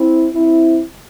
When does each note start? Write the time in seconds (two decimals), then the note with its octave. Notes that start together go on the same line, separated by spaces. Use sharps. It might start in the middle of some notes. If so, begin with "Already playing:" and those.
Already playing: C4 E4
0.32 C4 E4